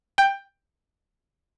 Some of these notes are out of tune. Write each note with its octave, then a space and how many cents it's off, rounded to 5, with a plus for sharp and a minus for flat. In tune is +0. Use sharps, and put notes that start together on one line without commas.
G5 +10